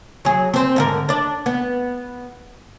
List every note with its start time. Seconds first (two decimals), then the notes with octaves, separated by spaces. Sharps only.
0.25 F#3 G#4
0.54 C4 C5
0.76 G#2 D3 A#4
1.09 D4 D5
1.46 B3